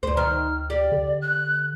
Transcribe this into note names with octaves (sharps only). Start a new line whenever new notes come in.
D2 G2 C5
D#3 F6
G4 D5
D3
F#6